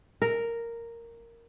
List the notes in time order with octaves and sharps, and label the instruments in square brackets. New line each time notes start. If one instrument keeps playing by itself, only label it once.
[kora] A#4